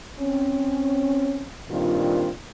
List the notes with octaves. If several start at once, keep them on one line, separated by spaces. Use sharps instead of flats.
C4 C#4
G2 A#2 D#3 C4 D4 F4